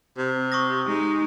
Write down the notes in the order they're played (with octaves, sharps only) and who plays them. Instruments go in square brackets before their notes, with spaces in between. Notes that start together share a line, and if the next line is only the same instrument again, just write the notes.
[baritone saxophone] C3
[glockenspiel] C#6 D#6 A#6
[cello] G#3 D#4